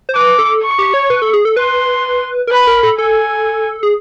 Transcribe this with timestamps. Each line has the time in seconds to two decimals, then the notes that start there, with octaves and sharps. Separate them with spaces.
0.09 C5
0.15 B4 D6
0.39 A4
0.63 C#6
0.78 G4
0.94 C#5
1.10 B4
1.22 A4
1.33 G#4
1.45 A4
1.57 B4 C6
2.47 A#4
2.51 B4 B5
2.67 A#4
2.83 A4
2.98 A4 G#5
3.83 G#4